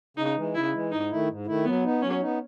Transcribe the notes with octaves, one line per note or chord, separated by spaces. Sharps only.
C#3 D#4
E3 G#3
C#3 E4
E3 G#3
G#2 D#4
D#3 A3 E4
G#2
D#3 A3 E4
F#3 B3
B3 D#4
F#3 C#4
B3 D#4